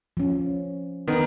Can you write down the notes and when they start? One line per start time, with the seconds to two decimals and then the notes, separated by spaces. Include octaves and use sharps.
0.17 F3 C#4
1.08 D#3 B3